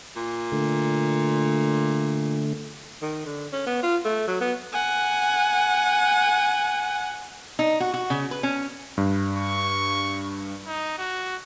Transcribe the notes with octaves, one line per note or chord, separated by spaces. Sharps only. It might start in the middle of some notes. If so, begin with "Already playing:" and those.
A#2
D3 A3
D#3
D3
C#4
B3
F4
A3
F#3
B3
F#5 G#5
D#4
F#4
F#4
C#3
B4
C#4
G2
C#6
D#4
F#4